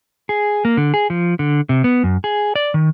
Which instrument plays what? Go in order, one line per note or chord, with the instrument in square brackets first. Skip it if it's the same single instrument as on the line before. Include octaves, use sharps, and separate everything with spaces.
[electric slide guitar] G#4
A#3
D3
G#4
F3
D3
C3
B3
F#2
G#4
D5
D#3